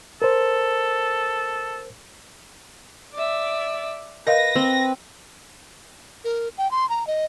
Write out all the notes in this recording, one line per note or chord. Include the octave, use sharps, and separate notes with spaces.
A4 A#4 C5
D5 E5
A#4 B4 D#5 F5 A#6
C4
A#4
G5
C6
A#5
D#5